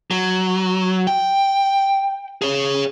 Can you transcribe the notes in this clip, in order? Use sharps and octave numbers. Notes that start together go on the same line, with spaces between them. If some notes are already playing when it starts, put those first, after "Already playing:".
F#3
G5
G#4 C#5